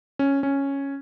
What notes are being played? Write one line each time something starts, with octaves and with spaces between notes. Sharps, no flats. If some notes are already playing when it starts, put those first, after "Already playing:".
C#4
C#4